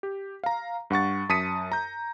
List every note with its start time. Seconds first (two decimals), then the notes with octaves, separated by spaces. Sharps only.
0.03 G4
0.44 F5 A#5
0.90 G2 F#5 C#6 A6
1.29 F#2 A5 D#6 B6 C#7 D#7
1.72 A#5 G6